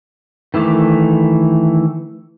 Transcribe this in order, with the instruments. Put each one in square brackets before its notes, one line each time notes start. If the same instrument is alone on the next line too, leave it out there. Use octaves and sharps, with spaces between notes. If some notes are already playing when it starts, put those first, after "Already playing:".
[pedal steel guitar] D#3 E3 A3 D6